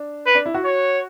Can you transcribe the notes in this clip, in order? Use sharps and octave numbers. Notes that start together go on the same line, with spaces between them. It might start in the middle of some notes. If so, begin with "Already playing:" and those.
Already playing: D4
B4
D4
E4
F#4
C#5